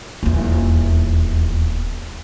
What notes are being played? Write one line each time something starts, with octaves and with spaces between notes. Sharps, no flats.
D#1 E2